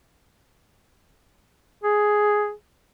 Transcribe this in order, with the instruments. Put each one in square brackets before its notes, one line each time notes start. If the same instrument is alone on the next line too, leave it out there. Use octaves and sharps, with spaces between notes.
[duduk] G#4